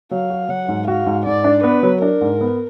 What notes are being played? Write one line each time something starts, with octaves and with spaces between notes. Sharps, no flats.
F#3 F5
F#4
F#3 F#5
G#2
F#4 F5
G#2
G#2 D5
D4
B3 B4
F#3
D4 A#4
G#2
B3